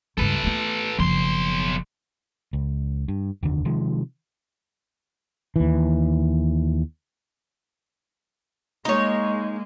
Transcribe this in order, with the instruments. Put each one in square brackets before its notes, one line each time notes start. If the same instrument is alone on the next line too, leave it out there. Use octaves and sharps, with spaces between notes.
[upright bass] C#2 G2 [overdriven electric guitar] A4 B4
[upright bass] A3 B3
[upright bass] F#1 F3 [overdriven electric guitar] B1 C6
[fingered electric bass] C#2
G2
F1 D#2 D3
C3 D#3 F3 G#3
[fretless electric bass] D#2 E3
[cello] G#3 A#3 [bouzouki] D#4 C#5